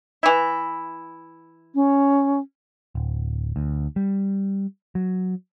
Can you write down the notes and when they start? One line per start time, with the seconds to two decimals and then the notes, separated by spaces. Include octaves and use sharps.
0.23 E3 E4
1.75 C#4
2.95 D1
3.56 D2
3.96 G3
4.95 F#3